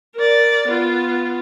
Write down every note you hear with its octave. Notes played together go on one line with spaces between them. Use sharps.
A#4 D5
B3 F4